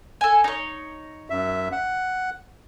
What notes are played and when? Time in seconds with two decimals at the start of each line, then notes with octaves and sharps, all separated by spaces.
0.21 A4 G#5
0.44 D#4 C#5
1.30 F#2 E5
1.72 F#5